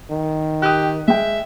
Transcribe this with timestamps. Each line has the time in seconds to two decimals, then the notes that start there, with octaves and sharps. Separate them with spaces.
0.11 D#3
0.62 G4 D#6 F#6
1.08 G#3 E5 G5